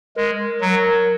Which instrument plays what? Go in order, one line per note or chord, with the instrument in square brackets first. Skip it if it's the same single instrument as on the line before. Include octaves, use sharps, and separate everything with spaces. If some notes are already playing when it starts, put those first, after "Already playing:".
[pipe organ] G#3 [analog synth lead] A#4
[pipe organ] F#3